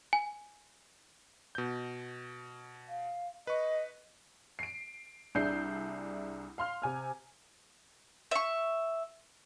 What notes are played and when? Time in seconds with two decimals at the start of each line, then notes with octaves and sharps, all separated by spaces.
0.13 G#5
1.55 B2 G6
2.89 F5
3.47 B4 D#5 C#6
4.59 C7 D7
5.35 C2 D4 G#4 E5 G6 C7
6.58 F5 C6 F6
6.82 C3 G#5 F6
8.31 E5 C#6